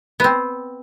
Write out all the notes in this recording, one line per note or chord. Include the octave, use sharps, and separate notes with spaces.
B3 C4